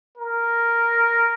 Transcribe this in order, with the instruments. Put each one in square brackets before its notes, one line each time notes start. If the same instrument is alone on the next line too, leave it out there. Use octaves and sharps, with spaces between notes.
[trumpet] A#4